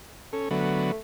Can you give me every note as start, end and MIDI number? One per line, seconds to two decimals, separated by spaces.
0.33 0.49 61
0.33 0.50 69
0.51 0.92 50
0.51 0.92 54
0.51 0.98 57
0.51 0.92 59